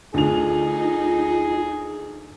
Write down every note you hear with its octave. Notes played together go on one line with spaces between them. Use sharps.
D2 D#4 F4 G#4 F7